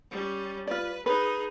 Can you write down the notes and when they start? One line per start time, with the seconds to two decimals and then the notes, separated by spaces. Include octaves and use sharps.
0.11 G3 C#4
0.67 F4 B4 D5
1.06 D#4 G#4 B4